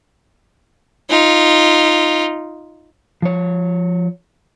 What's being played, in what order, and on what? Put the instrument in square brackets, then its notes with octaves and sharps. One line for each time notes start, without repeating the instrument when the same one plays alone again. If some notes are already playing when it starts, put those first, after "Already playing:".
[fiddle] D#4 F4
[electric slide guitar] F3 C#5